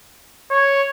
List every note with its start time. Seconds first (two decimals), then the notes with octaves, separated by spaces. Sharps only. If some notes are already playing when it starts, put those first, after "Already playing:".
0.51 C#5